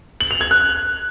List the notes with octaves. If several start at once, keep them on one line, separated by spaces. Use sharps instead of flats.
F#7
F7
G#6
F#6